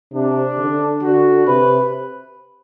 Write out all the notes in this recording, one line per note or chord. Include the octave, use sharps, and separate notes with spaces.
C3 D4
D3
D3 F#4
C3 B4